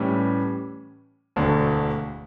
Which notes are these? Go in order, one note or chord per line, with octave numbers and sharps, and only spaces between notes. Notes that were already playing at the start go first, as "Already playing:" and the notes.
Already playing: A2 E3 G3 C#4
E1 D2 D3